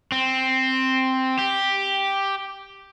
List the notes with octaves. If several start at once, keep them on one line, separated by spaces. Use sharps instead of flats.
C4
G4